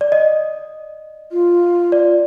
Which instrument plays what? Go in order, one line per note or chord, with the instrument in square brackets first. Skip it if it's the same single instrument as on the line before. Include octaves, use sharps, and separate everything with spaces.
[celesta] D5
D#5
[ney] F4
[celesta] D5